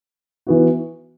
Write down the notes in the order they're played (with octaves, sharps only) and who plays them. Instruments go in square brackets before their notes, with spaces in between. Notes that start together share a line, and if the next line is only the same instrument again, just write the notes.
[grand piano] E3 B3 F#4